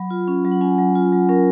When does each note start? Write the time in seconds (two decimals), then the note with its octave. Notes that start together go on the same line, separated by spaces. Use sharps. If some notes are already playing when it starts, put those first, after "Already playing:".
Already playing: F#3 B5
0.10 F4
0.28 C#4
0.45 F#3
0.51 F#5
0.61 C#4 G#5
0.78 F#3
0.95 F4
1.12 F#3
1.29 C#4 A#4